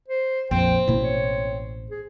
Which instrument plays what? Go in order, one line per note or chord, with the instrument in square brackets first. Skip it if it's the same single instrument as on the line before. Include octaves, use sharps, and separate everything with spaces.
[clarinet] C5
[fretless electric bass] A#1 F2 [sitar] C4 [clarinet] G5
[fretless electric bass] A1 B2 A#3 [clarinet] E4
[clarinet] C#5
G#4